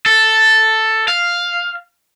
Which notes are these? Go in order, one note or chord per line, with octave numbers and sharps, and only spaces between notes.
A4
F5